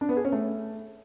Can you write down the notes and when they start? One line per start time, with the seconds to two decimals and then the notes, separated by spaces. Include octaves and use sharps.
0.01 D4
0.09 B3
0.17 G#4
0.25 C#4
0.32 A3